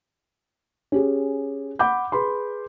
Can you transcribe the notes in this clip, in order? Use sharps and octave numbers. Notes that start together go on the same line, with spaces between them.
C#4 G4 G#4
F#5 B5 D6 G6
G#4 B4 B5 C6